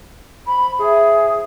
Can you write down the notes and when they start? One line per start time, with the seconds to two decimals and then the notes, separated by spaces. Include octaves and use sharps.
0.47 C5 B5
0.79 E4 G#4